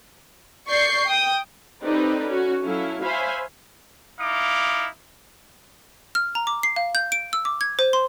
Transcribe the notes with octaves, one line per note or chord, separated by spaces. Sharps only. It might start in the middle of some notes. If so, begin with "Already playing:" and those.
D5 C#6 G6 C7
G5 D#6
C4 D#4 G4 A4 B4 D5
C#4 F#4
F#3 C#4 E4 A4 F5
C5 C#5 E5 F5 G#5 B5
D#4 E4 F5 D6
F6
A#5
D6
C7
F5
G6
D7
E6
D6
G#6
C5
C6